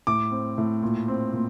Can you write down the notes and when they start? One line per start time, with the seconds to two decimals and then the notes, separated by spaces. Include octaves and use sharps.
0.07 A2 D6
0.31 C4
0.58 A2
0.83 A#2
1.08 C4
1.33 A#2